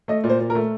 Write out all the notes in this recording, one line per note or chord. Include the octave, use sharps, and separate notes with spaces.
A3 D#5
A#2
C5
A#2
A#4
A3